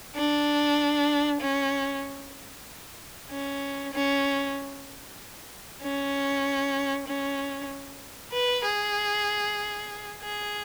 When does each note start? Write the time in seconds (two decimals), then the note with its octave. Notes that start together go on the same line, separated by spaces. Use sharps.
0.16 D4
1.41 C#4
3.30 C#4
3.93 C#4
5.82 C#4
7.07 C#4
8.32 B4
8.65 G#4
10.22 G#4